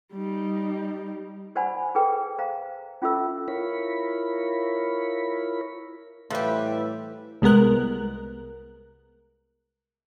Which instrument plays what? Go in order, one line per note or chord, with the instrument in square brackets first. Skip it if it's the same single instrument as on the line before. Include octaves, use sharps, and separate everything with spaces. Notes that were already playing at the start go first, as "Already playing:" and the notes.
[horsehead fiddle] G3 D#4
[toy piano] G4 C5 D5 F#5 G#5 B5
G#4 A4 B4 G5
C5 F5 A#5
C#4 F4 G4 A4 E5 E6
[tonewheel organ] E4 F4 A#4 C#5 B5
[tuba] A2 [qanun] E3 F5 [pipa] F3 G4 [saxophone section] G3 B4 E5
[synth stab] C2 G#3 B3 A#4 F#6